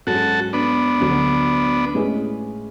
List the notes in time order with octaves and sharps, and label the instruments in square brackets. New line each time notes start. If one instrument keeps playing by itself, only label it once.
[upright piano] G#2 F#3 C#4 G#4 [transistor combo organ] F#4 A4
[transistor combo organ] B3 D4
[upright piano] D2 D3 F#3
A2 G#3 C#4 G#4 B4